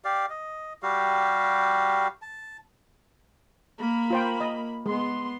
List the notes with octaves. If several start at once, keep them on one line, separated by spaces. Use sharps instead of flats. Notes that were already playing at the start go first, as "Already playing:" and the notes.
G4 D5 F5
D#5
G3 F#4 G4 F5
A5
A#3 B5
F4 C5 G5
D#5
G#3 B3 C6